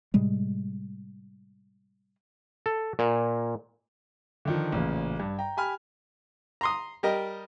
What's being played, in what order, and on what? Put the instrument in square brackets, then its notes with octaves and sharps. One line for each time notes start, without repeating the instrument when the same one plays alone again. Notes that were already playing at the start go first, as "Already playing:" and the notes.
[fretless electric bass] A2 C3 G3 G#3
[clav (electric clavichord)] A4
A#2
[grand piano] D3 D#3 F3
A1 A#2 C#3
G2
G5 A#5
G4 G#5 B5 F6
[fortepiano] A#5 C6 D#6
G3 G4 A#4 D#5